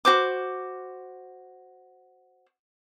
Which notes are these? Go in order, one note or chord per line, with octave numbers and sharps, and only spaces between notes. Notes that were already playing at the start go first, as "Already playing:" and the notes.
F#4 C5 D6